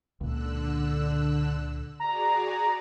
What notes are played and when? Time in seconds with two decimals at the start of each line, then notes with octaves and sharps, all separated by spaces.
0.21 C#2 A#2 D3 E6 F#6
2.00 F#4 G#4 D5 A#5